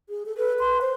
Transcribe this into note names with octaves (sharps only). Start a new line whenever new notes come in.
G#4
A4
A4 B4
C6
C5